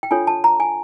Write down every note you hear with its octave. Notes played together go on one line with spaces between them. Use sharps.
G5
D4 F4 A4 C#5 G#5
A5
A#5
G#5